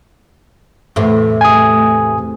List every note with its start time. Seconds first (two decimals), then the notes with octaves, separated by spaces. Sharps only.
0.96 E2 A2 C3 A3
1.41 G#5 D#6